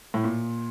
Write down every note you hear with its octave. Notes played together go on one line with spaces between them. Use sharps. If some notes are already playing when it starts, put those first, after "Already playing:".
A2
A#2